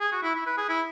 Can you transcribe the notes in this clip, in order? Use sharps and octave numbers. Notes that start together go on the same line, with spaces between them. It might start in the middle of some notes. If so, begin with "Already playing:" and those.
G#4
F#4
E4
E4
B4
G#4
E4